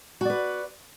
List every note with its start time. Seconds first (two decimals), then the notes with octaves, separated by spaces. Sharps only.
0.21 F#4
0.25 D5
0.30 B4